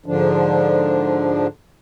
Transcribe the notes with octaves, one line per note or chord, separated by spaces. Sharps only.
G#2 D3 F3 D4